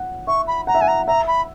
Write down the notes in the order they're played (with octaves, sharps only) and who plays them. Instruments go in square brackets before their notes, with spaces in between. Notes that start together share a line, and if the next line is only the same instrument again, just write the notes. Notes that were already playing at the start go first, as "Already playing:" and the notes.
Already playing: [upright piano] F#5
[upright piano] E5 [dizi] C#6
[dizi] B5
[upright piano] F#5 [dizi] A#5
[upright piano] E5
[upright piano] F#5 [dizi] G#5
[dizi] A#5
[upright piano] E5 [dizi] A#5
[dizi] B5